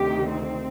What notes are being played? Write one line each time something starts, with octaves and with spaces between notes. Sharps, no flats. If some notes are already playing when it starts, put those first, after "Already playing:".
Already playing: D2 C3 D#3 G4
C4